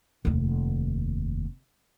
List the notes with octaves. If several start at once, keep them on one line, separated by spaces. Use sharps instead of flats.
F1 D#2